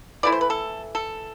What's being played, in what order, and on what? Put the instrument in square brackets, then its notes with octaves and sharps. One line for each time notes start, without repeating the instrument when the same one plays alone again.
[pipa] E3 A3 E4 D5
C5
B4
A4
A4